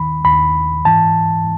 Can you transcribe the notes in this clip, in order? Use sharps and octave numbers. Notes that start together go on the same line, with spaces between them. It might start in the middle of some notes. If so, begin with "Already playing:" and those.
Already playing: D#2 D#3 B5
D#2 D#3 B5
G#2 E3 A5